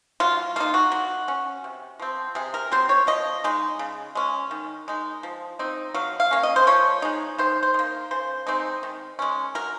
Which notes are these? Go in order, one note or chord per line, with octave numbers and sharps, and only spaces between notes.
F#3 F4
A#3 D#4 F4
F#4
F#3
C#4
C3
F3 C4
C3 G#4
A#4
F#3 C4 C5
C#5
F3 D#5
G#3 D#4
C#3
G#3 C#4
D#3
G#3 D#4
F3
C4 D#4
F#3 F5
F5
A#3 C#4
D#5
C5
F3 C#5
G#3 D#4
D#3 C5
C5
A#3 D#4
C#3 C5
G#3 C4 D#4
D#3
G#3 C#4
F#3 A#4